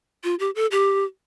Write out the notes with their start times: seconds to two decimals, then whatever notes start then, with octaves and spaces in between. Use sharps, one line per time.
0.24 F4
0.39 G4
0.55 A4
0.71 G4